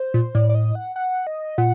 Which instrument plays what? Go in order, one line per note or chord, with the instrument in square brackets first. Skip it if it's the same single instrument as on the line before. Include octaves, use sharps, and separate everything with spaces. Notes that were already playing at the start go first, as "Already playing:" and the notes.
Already playing: [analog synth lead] C5
[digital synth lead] A#2
[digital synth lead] A2 [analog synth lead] D5
[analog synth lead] D5
D#5
F#5
F#5
D#5
[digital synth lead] A#2 [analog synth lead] F#5